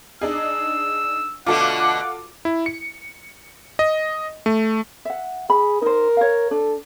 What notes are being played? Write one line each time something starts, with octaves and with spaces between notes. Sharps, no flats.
D4 D#4 G#4 E6
B2 D3 A3 F4 F#4 A4 F#5 D6
E4
C#7
D#5
A3
E5 F#5
G#4 B5
D#4 A#4 C5
C#5 F5
D4 A4